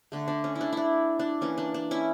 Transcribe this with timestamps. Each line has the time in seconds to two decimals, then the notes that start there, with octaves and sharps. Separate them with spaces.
0.12 D3 A3
0.28 D4
0.44 C#4
0.56 E4
0.61 D4
0.72 D4 E4
1.19 D4
1.41 E3 A#3 C#4
1.58 D4
1.74 D4
1.91 C#4 E4